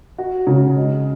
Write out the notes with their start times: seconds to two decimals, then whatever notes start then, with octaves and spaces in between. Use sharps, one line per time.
0.18 F#4
0.47 C#3
0.76 G#3